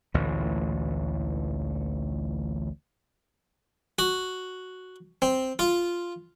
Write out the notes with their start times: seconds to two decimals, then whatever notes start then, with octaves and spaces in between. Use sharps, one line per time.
0.14 A1 D2 A#2 E3
3.99 F#4
5.22 C4
5.59 F4